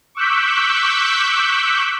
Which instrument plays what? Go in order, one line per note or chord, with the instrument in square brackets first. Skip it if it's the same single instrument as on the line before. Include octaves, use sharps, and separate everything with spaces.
[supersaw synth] C#6 D6 E6 F#6 G6 B6